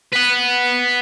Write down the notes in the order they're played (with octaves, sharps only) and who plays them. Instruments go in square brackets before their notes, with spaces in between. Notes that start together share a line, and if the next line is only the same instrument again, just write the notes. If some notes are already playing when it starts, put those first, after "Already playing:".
[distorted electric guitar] B4 F#5